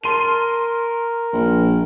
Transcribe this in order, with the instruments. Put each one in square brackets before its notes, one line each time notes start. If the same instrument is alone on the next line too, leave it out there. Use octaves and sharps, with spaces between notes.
[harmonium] A#4 A5 [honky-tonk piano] C6 D#7
[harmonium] A#4
[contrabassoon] A#1